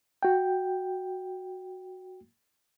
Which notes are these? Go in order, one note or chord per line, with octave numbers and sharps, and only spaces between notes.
F#4 G5